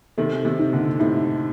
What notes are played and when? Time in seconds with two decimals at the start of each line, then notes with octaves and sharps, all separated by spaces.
0.17 C3 D#3 A4
0.45 C3 D#3
0.59 D#4
0.72 A#2 D3
0.99 A2 C3 D#4